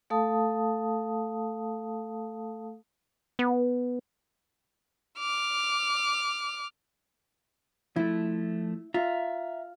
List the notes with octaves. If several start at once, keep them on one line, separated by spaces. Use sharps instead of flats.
A3 A4 F5 A5 D#6
B3
D6 F6
F3 A3 E4
F4 E5 A#5